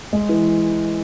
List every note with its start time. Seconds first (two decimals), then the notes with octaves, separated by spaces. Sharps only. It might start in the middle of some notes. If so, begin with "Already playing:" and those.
0.13 G#3
0.29 E3